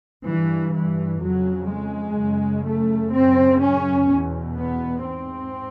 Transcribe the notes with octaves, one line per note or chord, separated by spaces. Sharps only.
G2 E3
E3
F2 C#3 F#3
G#3
F#2 C#3
A3
F#2 C#3 C4
C#4
E2 B2
B3
G#2 C4